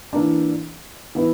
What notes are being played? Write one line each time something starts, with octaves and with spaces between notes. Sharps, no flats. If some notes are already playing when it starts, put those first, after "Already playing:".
E3 A#3 D4
E3 B3 E4